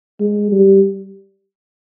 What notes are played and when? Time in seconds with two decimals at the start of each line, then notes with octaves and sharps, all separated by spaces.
0.20 G#3
0.52 G3